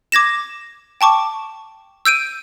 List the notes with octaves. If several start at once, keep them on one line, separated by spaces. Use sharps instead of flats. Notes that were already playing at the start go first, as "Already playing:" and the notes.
D6 G#6 A#6 E7
G5 A5 C#6 D6
E6 G6 D7 D#7